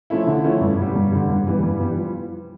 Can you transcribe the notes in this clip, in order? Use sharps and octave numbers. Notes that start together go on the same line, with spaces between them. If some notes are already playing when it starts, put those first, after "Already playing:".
F3 A3 C#4 E4
D3
F3 A3 C#4 E4
G2
D3 G3
G2
D3 G3
G2
E3 G3 B3
G2
E3 G3 B3
F3